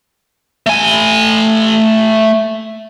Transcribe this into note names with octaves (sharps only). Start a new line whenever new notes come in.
A3 G#5